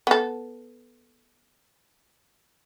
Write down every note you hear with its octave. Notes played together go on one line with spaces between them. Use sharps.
B3 A4